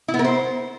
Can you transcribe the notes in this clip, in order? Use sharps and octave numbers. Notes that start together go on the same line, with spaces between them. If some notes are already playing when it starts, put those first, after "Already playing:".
E4
B3
A#4
C5